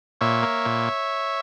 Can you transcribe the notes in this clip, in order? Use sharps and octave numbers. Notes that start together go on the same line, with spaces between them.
A#2 C#5 E5
A#3
A#2